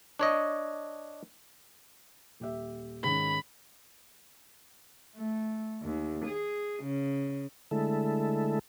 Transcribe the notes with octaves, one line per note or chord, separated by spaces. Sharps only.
D4 C#5 D#5
D#1 G4 E5
G#2 D#3 C#4 B5
A3
D#2
G#4
C#3
D3 G#3 A3 E4 A4